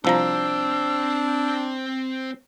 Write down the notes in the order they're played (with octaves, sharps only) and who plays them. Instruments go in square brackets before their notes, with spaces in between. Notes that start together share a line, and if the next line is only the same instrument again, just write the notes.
[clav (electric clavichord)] C2 F3 A#5 [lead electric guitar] C4 C5 [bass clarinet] D4 [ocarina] E6